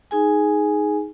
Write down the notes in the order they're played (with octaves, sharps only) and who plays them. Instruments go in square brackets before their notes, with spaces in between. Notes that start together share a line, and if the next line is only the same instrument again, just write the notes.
[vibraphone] D#4 G#4 G#5